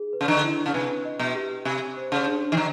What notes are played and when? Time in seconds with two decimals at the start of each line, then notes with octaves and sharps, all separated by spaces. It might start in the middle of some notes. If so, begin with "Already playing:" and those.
Already playing: D#4 G#4
0.13 B4
0.21 C#3
0.28 D3
0.44 E4
0.66 C#3
0.74 C3 B4
1.05 D#5
1.19 B2
1.35 G4
1.65 C3 G4
1.97 C5
2.12 C#3
2.27 D4
2.52 D#3
2.57 D3